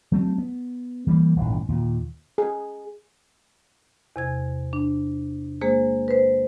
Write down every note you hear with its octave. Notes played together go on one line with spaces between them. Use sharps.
F#3 A3 C4
B3
E3 G3 A3 A#3
D#1 A1 G#2
D#2 A#2
G#4
E2 C3 G#6
D4
G#3 A#3 G#4 C5
B4 C5